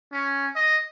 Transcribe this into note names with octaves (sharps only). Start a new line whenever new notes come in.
C#4
D#5